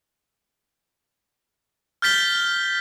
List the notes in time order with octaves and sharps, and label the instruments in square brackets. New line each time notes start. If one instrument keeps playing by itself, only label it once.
[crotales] F6 G6 A6 B6 G7